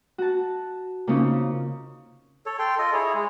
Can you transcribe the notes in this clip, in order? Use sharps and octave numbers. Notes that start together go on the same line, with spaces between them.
F#4 A5
C#3 A#3 C4 C#4 D#4 F4
A4 C#5
A4 G5 C6
F4 A4 D#5
E4 G#4 C#5
G#3